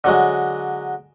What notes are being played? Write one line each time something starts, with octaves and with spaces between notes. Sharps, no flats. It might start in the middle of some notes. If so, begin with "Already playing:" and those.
D3 F#3 G#3